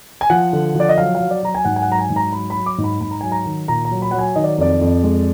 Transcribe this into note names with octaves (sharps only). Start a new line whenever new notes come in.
G#5
F3 F#5
D3
F3
D5
D#5
F#3 F5
F5
F#3
D5
F#3 A#5
G#5
G#2 F#5
G#5
F#5
F#3 A#5
G#5
G#2
A#5
F#3 B5
B5
F#3
D6
G#2
B5
G#2 B5
A#5
F#3 G#5
A#5
D#3
A#2 A#5
A#5
F#3
B5
F#3 F#5
G#5
D#3 D#5
D5
F2 D5
F2
G#3